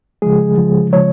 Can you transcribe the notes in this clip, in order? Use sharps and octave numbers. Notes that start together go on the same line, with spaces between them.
C#3 F3 G#3 G#4
C#3 F3 G#3
C#3 F3 G#3 C#5